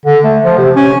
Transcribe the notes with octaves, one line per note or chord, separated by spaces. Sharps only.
D3
A3
F3
C3
C#4